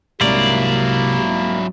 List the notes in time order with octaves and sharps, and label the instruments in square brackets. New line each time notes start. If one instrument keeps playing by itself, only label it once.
[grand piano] C2 G#2 D4 [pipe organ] C3 [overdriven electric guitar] F#3 E4 [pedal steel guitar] A#3 D5